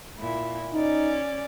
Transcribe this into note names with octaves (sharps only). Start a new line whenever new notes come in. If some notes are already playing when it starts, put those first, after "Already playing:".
A#2 E4
C#4 D#4 D5